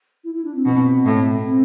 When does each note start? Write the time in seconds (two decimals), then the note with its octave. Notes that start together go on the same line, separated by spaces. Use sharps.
0.24 E4
0.35 E4
0.45 D4
0.55 C4
0.66 B2
1.05 A2
1.46 C4